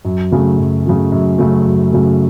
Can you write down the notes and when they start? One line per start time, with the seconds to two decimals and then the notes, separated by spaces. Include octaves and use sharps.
0.05 F#2
0.31 C#3 F#3 A3
0.58 F#2
0.86 C#3 F#3 A3
1.12 F#2
1.39 C#3 F#3 A3
1.66 F#2
1.92 C#3 F#3 A3